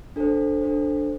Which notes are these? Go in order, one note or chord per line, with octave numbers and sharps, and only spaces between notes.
D4 A4 C5
D4 A4 C5